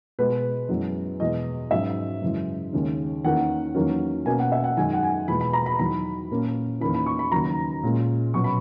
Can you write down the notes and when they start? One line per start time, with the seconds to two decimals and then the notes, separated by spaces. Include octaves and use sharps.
0.19 B2 G#3 B3 B4
0.69 F#2 E3 G#3 B3
1.20 E2 B2 G#3 B3 D#5
1.71 G#2 F#3 C#4 E5
2.22 F#2 C#3 E3 G#3
2.73 D#2 C#3 G#3 C#4
3.24 E2 D#3 A#3 C#4 F#5
3.75 E2 D#3 F#3 A#3 C#4
4.26 B2 A#3 C#4 G#5
4.39 F#5
4.52 E5
4.64 F#5
4.77 F#2 D#3 G#3 G#5
4.93 F#5
5.03 G#5
5.28 E2 B2 G#3 B3 B5
5.41 B5
5.53 A#5
5.66 B5
5.79 E2 D#3 F#3 B5
6.31 A#2 A#3 C#4
6.81 E2 D#3 A#3 C#4 B5
6.94 B5
7.06 C#6
7.19 B5
7.32 D#2 C#3 F#3 A#5
7.83 A#2 G#3 C#4
8.34 B2 F#3 C#4 C#6
8.44 B5